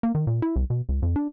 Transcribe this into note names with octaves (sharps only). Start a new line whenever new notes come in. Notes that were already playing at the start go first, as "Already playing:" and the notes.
A#3
D#3
A#2
E4
C2
B2
C#2
F2
D4